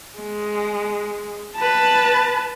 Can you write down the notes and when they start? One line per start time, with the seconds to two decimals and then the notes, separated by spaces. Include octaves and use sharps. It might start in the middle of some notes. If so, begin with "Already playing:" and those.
0.18 G#3
1.56 B4 A5